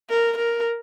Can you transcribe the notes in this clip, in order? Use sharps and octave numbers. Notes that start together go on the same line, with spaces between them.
A#4
A#4